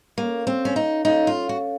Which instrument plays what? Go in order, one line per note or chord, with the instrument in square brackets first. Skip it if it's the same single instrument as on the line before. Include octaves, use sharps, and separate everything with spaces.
[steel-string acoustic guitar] A#3 [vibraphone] C#4 A4 C#5 F5
[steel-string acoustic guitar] C4
C#4
D#4
[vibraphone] C#4 A4 C#5 F5 [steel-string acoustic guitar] D#4
[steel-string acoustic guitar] F4
F#4